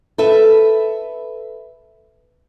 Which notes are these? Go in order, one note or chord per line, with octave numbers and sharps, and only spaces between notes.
A4 B4 E5